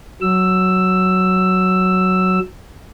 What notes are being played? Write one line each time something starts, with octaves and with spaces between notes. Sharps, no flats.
F#3 E6